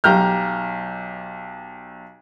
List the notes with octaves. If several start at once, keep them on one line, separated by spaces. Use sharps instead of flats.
B1 G4 A#5 F6 G6